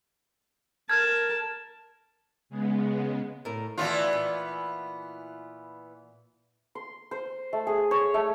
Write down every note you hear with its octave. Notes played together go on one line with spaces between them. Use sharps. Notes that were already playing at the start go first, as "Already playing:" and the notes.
A#4 A5 F6 G#6
C#3 G#3 B3
A2 A#4
D2 E3 B3 F4 D5 A5
A#2
C6
C5
A3
G#4
C#5
A3